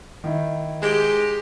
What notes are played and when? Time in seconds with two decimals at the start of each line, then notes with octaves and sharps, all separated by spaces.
0.24 D#3 E4
0.82 G#3 G4